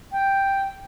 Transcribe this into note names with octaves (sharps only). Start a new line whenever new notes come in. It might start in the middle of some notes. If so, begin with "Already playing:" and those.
G5